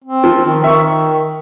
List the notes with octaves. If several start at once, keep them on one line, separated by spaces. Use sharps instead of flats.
C4
F3
D#3
D#3 E5 C#6